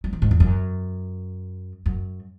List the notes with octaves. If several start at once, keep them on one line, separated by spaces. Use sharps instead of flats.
F#3
E3
G#2
E2
F#2
F#2